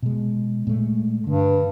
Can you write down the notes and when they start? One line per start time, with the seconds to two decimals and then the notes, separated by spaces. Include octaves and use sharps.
0.02 B2 G#3
0.67 A#2 G#3 A3
1.27 G2 D3